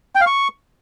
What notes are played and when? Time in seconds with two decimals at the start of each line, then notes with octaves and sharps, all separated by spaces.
0.15 G5
0.21 F5
0.26 C#6